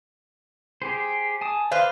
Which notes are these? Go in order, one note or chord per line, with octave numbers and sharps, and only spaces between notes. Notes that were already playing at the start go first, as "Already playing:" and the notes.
G4 G#4 C5
G#5 A5 D#6
B4 C5 D5 F5 C6